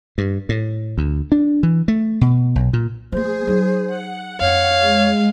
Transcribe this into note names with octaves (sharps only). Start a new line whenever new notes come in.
G2
A2
D2
D4
E3
A3
B2
B1
A#2
F3 A3 G#4 C5
F#3 D#4
F#5
F2 C#5 F5
G#3